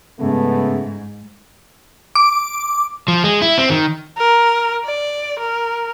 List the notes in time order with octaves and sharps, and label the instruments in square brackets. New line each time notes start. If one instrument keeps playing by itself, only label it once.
[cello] G#2 [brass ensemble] C#3 A3 B3
[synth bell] D6
[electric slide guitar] F3
G#3
E4
C4
D#3
[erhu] A#4
D5
A#4